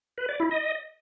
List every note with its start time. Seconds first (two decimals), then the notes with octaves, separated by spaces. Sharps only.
0.18 B4
0.29 D5
0.40 E4
0.51 D#5